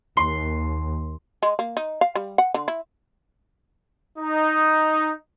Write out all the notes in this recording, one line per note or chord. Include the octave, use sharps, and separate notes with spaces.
D#2 C6
G#3
A#3
D#4
F5
G3
F#5
D3
E4
D#4